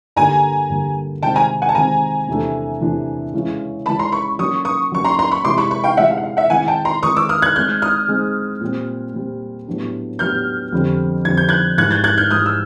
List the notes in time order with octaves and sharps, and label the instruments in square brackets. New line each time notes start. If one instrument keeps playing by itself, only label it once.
[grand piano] G2 D3 G3 A#3 [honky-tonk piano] G#5 A#5
[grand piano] G2 D3 G3 A#3
[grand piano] C3 D#3 G#3 C4 [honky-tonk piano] G5 A5
[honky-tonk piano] G#5 A#5
F#5 G#5
A5
[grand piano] C3 D#3 G#3 C4 [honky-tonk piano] G#5 A#5
[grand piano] E2 C3 E3 A3 D4
E2 C3 E3 A3 D4
C#3 E3 G#3 C#4
[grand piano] C#3 E3 G#3 C#4 [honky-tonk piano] A5 B5
[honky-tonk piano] A#5 C6
B5 C#6
[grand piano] F#3 A#3 C#4 F#4 [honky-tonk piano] C#6 D#6
[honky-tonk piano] C#6 D#6
[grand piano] F#3 A#3 C#4 F#4 [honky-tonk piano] C#6
[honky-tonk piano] A#5 C6
A#5 C6
B5 C#6
[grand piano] C3 E3 G#3 [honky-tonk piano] C6 D6
[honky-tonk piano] B5 C#6
B5 C#6
F5 G5
[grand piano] C3 E3 G#3 [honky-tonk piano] E5 F#5
[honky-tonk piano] F5
F#5
F5
E5 F#5
[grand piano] D#3 G#3 C4 E4 [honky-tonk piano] F#5 G#5
[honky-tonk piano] G5 A5
A#5 C6
[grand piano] D#3 G#3 C4 E4 [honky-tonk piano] C#6 D#6
[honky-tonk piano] D6 E6
D#6 F6
F#6 G#6
[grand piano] G#3 C4 D#4 G#4 [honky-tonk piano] F6 G6
[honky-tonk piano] D#6 F6
[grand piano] G#3 C4 D#4 G#4
A#2 G3 C4
A#2 G3 C4
A2 F#3 B3 D4 G4
[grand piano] A2 F#3 B3 D4 G4 [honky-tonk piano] F6 G6
[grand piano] F2 D3 G3 C4
[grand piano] F2 D3 G3 C4 [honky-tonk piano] G#6
[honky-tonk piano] G6
F#6 G#6
[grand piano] G#2 E3 G3 [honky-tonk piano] F#6 G#6
[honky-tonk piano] G6 A6
F#6 G#6
F6 G6
[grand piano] G#2 E3 G3 [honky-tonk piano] D#6 F6
[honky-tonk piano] E6